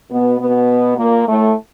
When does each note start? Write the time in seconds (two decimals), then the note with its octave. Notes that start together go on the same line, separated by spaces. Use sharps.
0.10 B2 B3
0.40 B2 B3
0.98 A#2 A#3
1.26 A2 A3